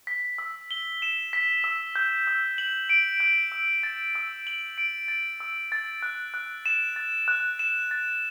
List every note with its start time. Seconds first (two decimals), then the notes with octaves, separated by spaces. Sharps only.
0.07 B6
0.38 E6
0.71 G7
1.02 E7
1.33 B6
1.64 E6
1.96 G6
2.27 E6
2.58 F#7
2.89 D7
3.20 G6
3.52 E6
3.83 A6
4.15 E6
4.47 F#7
4.78 D7
5.08 A6
5.40 E6
5.72 A6
6.02 F#6
6.34 F#6
6.66 E7
6.96 A6
7.28 F#6
7.59 E7
7.91 A6